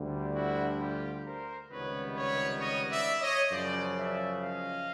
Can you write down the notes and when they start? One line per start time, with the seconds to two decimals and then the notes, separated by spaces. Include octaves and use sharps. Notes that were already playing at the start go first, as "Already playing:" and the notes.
Already playing: D2 D3 G3
0.33 E4 F#4
0.78 F4 G4
1.24 A#4 C5
1.70 C#2 C3 D#3 G3 B3 B4 C#5
2.15 B4 C#5
2.60 C#5 D#5
2.90 D5 E5
3.21 C#5 D#5
3.51 F#2 C#3 F3 C5 D5
3.97 D5 E5
4.42 D#5 F5